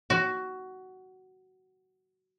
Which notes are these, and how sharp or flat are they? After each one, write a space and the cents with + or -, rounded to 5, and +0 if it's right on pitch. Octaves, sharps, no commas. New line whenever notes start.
F#4 +15